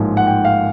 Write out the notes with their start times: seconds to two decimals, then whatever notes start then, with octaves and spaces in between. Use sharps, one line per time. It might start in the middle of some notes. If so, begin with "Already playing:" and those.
Already playing: A1 G#2 F3 A#3
0.17 F#5
0.27 G5
0.45 F5